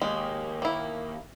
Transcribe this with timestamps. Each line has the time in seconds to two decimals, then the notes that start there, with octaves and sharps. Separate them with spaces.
0.02 D#2 G#3
0.62 A#3 E4